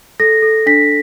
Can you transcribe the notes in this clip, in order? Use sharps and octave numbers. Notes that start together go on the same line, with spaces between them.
A4 A#6
A4
D4 B6